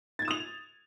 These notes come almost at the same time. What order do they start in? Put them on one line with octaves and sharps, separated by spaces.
A6 G#6 E7 D#6 F7